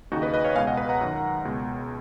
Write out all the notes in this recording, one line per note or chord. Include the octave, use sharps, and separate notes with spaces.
D#2 C#3 D#4 F#4
B4 D#5
B4 D#5
C#5 F5
C#2 B2 F5 G#5
D#5 F#5
B4 D#5
F#5 A#5
F#2 D#3
C#2 B2